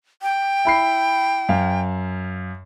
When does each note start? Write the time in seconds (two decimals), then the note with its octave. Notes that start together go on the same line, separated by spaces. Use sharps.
0.22 G5
0.65 E4 B5 C7
1.49 F#2 F5